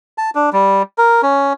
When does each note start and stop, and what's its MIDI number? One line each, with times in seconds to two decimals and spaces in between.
0.18 0.30 81
0.35 0.50 62
0.53 0.82 55
0.98 1.22 70
1.23 1.53 61